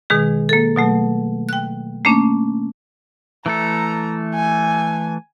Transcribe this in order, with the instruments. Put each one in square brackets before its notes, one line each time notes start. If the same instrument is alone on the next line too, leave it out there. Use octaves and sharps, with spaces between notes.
[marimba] B2 D#3 G#3 G#4
A#3 A4
B2 F#3 A3
G5 F#6
A3 A#3 C#4 D4
[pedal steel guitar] E3 A3 A4 [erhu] A#5
[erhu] G#5